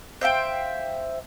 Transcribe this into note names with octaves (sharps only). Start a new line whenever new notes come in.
C5 E5 F5 G5